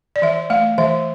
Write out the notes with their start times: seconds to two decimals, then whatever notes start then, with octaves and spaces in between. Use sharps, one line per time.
0.16 D5
0.22 E3 E5
0.50 A3 F5
0.78 E3 E5